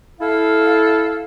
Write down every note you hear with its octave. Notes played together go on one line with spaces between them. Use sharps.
E4 A4 F5